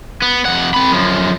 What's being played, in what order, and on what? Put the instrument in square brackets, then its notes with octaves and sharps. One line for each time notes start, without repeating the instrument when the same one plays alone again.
[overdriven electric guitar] B3
F2 F#5
C4 B5
F#2 F3